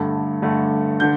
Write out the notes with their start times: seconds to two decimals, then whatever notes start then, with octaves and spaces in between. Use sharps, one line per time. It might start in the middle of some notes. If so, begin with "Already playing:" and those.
Already playing: G2 D3 A3
0.42 G2 D3 A3
1.00 D3 G6